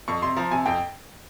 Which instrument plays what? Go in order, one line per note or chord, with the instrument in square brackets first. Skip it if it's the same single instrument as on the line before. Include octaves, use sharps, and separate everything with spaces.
[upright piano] F2 C#6
C3 C6
F3 A#5
C3 G#5
F2 G5